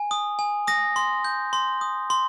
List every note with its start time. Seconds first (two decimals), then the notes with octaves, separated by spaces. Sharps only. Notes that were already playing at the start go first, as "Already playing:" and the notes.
Already playing: G#5
0.11 D#6
0.39 G#5
0.67 D#6 A#6
0.96 C6
1.24 G6
1.53 C6
1.81 D#6
2.10 C6